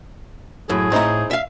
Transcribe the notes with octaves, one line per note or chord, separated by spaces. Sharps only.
F#2 A2 G#4
A2 C4 D#4 E4 A#5
E5 F5